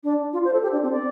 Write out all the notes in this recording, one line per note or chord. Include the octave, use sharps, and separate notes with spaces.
D4
F4
C5
A4
G4
D4
C4
D5